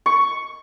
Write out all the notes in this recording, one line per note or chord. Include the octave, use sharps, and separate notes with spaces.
C#6